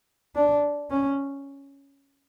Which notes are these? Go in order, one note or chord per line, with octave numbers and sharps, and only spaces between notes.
D4
C#4